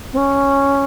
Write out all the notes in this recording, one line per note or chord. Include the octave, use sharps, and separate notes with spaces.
C4
C#4